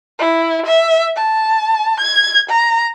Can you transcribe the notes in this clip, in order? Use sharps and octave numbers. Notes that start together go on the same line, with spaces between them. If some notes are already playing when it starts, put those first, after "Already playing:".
E4
E5
A5
G#6
A#5